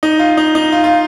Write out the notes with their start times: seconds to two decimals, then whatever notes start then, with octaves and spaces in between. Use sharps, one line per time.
0.03 D#4
0.19 F4
0.37 D#4
0.55 D#4
0.72 F4
0.84 F4